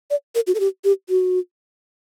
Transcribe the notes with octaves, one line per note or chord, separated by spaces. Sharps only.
D5
A#4
F#4
A4
G4
G4
F#4